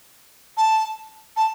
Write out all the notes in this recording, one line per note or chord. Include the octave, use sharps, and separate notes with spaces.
A5
A5